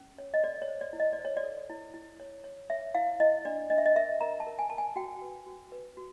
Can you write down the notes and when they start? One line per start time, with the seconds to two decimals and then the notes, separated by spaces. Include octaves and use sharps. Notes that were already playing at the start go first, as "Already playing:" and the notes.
Already playing: C#4
0.18 C#5
0.34 D#5
0.43 A4 D5
0.62 C#5
0.68 C5
0.81 D5
0.93 E4
1.00 D#5
1.13 D5
1.19 C5
1.25 C#5
1.37 D5
1.44 A4
1.70 E4
1.94 E4
2.20 C#5
2.44 C#5
2.70 C#5 E5
2.95 E4 F5
3.20 E4 D#5
3.45 D4 D5
3.70 D4 D#5
3.78 E5
3.86 D#5
3.96 A#4 E5
4.21 A#4 A#5
4.40 A5
4.47 A#4
4.59 G#5
4.70 A#4 A5
4.78 G#5
4.96 F#4 G5
5.22 B4
5.46 F#4
5.72 B4
5.97 F#4